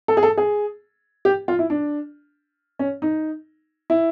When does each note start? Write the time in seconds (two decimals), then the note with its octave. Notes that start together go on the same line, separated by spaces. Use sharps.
0.08 A4
0.17 G#4
0.23 A4
0.38 G#4
1.25 G4
1.48 F4
1.59 E4
1.70 D4
2.79 C#4
3.02 D#4
3.90 E4